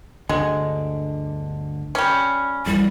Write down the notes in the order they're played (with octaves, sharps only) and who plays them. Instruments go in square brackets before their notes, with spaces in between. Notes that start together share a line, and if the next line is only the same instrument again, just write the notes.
[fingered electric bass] G1 D2 D3 [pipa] G#3
[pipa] G3 C#4
[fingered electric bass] G#1 F2 E3 [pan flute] G3